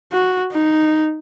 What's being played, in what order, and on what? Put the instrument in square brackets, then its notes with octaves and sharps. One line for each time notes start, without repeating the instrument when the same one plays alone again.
[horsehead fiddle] F#4
D#4